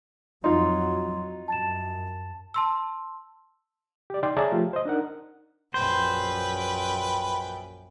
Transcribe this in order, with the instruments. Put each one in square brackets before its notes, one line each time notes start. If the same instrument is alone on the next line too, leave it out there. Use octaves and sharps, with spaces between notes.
[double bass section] F2 F#3 [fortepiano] D#4 F4 [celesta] C6
[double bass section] F#2 [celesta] A5 A6 E7
[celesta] A5 C6 E6
[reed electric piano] G4 D5
D#4 D5 G5 C6
G#4 C#5 D5 E5 A5 A#5
F3 A3 F4 G4
C5 D#5
D4 D#4 A#4 F#5
[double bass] A#1 F#2 [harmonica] B4 G5 [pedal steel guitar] C5